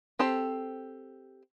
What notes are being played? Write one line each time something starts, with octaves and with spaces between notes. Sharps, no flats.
C4 G4 A4 C5